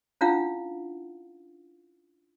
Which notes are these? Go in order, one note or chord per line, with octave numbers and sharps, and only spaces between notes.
C#4 D4 E4 F4 F5 F#5